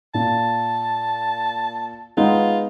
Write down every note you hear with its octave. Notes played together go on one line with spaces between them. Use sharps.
A#2 A5
G#3 B3 D#4 F4